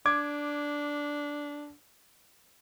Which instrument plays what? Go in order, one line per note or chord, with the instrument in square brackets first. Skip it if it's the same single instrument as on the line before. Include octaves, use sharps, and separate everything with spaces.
[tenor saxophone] D4 [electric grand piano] D6 G#6